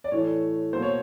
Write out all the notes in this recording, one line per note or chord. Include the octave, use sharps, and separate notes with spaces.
D5
A2 E3 A3 C#5
B2 F#3 A#3 C5
C#5